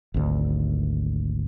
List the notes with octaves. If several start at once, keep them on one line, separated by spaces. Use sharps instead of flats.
G#1 D2